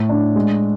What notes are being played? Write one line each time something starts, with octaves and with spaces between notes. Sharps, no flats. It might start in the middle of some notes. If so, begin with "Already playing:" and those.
Already playing: A2
D4
G#3